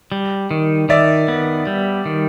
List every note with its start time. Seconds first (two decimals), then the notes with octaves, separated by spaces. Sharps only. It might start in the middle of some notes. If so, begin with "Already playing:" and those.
0.12 G3
0.51 D#3
0.89 D#3 D5 E5
1.28 B3
1.67 G3
2.06 D#3